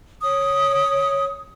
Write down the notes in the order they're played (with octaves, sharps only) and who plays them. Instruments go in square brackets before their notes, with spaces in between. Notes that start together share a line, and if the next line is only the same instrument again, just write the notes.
[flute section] C#5 D#6